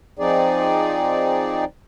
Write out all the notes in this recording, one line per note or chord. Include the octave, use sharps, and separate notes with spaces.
F3 C4 D#4 G#4 D5